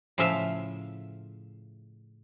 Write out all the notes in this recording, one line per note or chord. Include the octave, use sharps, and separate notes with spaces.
A2 C#3 F3 A3 E5 F5